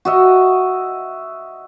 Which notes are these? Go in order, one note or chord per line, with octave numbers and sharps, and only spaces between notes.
F#4 D#5 E5